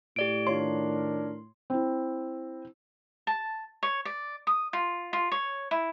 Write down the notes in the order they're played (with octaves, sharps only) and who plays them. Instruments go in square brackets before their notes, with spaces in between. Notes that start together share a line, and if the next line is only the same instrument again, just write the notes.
[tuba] A2 [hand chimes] G4 D5 D7
[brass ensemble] D#3 D4 A#4 [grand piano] F4 C#5 [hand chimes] C6
[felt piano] C4 E4
[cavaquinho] A5
C#5
D5
D#6
F4
F4
C#5
E4